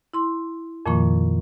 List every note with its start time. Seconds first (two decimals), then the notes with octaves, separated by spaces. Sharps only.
0.14 E4 C6
0.86 F2 A#2 D#3 F3 A#3 C#6